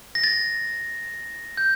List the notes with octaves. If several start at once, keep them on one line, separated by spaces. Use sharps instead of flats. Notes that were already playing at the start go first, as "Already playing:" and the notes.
A#6
A6
G6